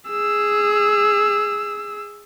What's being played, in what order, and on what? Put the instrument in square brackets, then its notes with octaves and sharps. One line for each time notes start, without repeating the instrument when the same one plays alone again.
[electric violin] G#4 E6